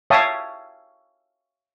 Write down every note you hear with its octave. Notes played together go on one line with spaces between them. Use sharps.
C#5 E5 F5 G5 A5 D#6